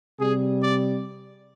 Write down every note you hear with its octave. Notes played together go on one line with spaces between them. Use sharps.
C3 G3 G#4
D5